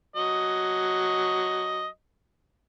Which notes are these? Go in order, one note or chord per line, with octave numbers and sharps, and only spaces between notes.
F#3 D#5